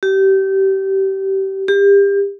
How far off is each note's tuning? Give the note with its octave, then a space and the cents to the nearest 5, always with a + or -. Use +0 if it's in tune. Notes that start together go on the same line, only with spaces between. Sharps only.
G4 -25
G4 +30